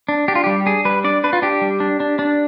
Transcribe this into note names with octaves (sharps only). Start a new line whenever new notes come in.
D4
D4 G4
F4
G3 G4
D4 G#4
G3 B4
D4 D5
D4 B4
F4
D4 G4
G3
D4
D4
D4